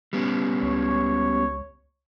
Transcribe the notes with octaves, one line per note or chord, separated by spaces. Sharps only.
G3 B3 C#4
C#2 C#5